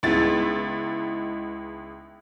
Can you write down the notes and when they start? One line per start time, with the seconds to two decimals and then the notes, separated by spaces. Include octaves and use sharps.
0.03 C#2 G#3 B3 D#4 E4 A6